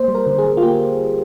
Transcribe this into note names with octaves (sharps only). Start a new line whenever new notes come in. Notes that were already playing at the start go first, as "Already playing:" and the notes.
Already playing: A#3 C5
G3
A#4
D3
G#4
D3
F4
A#3 G4